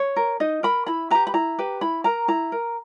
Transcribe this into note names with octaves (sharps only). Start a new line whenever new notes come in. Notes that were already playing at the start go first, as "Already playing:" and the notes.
Already playing: C#5
A#4
D#4 D#5
A#4 B5
E4 B5
G4 B4 A#5
B5
E4 A#5
G4 B4
E4 B5
A#4 A#5
E4 A#5
A#4